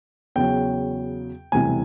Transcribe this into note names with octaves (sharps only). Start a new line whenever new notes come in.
E2 C#3 F#3 G5
E1 D2 C3 E3 G3 G#5